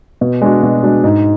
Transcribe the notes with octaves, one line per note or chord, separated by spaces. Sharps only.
B2
G#3 D4 F#4
B2
G#3 D4 F#4
G#2